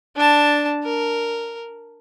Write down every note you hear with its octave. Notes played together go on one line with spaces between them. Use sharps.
D4 A5
A#4